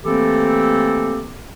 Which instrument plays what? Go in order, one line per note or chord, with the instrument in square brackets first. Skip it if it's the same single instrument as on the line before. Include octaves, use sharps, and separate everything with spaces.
[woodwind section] E3 A3 A#3 C4 G4 A4